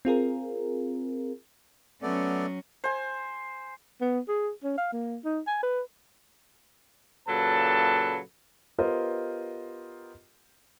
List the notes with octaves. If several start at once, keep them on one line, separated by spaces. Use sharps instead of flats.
C4 F4 G#4 A#4
F#3 A3 B3 C#4 D5
C5 G#5
B3
G#4
C#4
F5
A#3
D#4
G#5
B4
A#2 C#3 F#3 A4 B4 A5
B3 F4 G4 A#4 C5 D#5